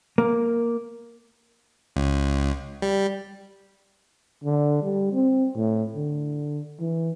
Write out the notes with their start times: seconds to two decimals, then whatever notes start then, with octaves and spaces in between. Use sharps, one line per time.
0.18 A#3
1.96 C#2
2.82 G3
4.44 D3
4.83 G3
5.13 C4
5.55 A2
5.96 D3
6.80 E3